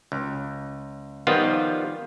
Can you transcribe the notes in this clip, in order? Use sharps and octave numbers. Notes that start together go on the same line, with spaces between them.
C#2
D#3 F3 G3 B3 F4